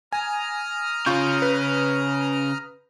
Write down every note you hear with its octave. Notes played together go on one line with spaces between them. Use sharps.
G#5 A#5 D#6 F6
C#3 C#4 F4 C#6 G6
B4